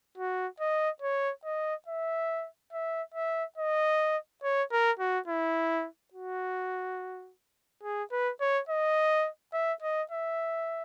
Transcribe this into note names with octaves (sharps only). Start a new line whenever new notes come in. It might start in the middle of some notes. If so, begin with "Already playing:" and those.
F#4
D#5
C#5
D#5
E5
E5
E5
D#5
C#5
A#4
F#4
E4
F#4
G#4
B4
C#5
D#5
E5
D#5
E5